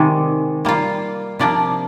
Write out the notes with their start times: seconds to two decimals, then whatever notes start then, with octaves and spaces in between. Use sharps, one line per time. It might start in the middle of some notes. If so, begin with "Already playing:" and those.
Already playing: C3 D#3 G#3 D5
0.65 G3 A#3 F4
1.39 C3 F3 A#3 D4 D5